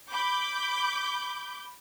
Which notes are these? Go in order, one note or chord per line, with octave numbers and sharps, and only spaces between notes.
B5 D6 G6